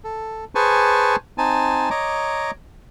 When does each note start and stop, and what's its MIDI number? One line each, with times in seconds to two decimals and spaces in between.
0.04 0.45 69
0.55 1.16 68
0.55 1.16 71
0.55 1.16 72
0.55 1.16 80
0.55 1.16 81
0.55 1.16 85
1.38 1.89 60
1.38 1.89 63
1.38 1.89 80
1.38 1.89 81
1.90 2.51 73
1.90 2.51 75
1.90 2.51 82
1.90 2.51 86